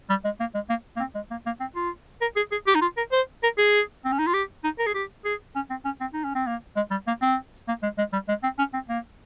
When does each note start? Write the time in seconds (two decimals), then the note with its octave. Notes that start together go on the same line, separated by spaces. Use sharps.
0.10 G3
0.24 G#3
0.40 A#3
0.54 G#3
0.70 A#3
0.97 A#3
1.00 C4
1.15 G#3
1.31 A#3
1.46 A#3
1.60 C4
1.76 F4
2.21 A#4
2.36 G#4
2.52 G#4
2.67 G4
2.75 D#4
2.82 F4
2.97 A#4
3.12 C5
3.43 A#4
3.58 G#4
4.05 C4
4.12 C#4
4.19 D#4
4.27 F4
4.34 G4
4.64 D#4
4.79 A#4
4.86 G#4
4.94 G4
5.25 G#4
5.56 C#4
5.70 C4
5.85 C#4
6.01 C4
6.14 D#4
6.24 C#4
6.35 C4
6.47 A#3
6.76 G#3
6.91 G3
7.07 A#3
7.22 C4
7.68 A#3
7.83 G#3
7.98 G#3
8.13 G3
8.28 G#3
8.43 C4
8.59 C#4
8.74 C4
8.89 A#3